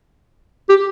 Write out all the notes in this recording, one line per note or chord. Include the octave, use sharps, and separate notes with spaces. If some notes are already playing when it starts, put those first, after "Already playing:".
G4